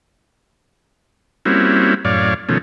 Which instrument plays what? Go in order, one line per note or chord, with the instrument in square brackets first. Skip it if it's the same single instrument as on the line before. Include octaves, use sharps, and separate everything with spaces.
[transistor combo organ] G3 A#3 C4 C#4 E4 F#4
F#2 A2 C#5 D5 F5
B2 D#3 F3 A3 C#4